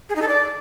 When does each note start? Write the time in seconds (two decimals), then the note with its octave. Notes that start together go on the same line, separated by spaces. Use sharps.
0.09 G#4
0.16 D#4
0.22 A4
0.28 D5